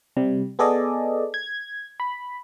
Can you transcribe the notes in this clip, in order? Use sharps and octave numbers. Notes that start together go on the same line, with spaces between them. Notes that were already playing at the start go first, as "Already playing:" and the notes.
C3 G3
B3 G#4 A4 D5 D#5
G#6
B5